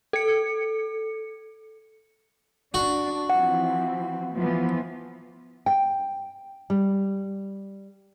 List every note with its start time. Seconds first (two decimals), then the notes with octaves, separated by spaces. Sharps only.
0.13 A4 C#7
2.74 D4 F#4
3.30 E3 F3 C4 F#5
4.34 E3 F3 B3
5.66 G5
6.70 G3